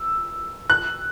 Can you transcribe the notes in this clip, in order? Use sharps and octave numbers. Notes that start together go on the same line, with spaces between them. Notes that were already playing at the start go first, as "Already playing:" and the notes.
Already playing: E6
F#6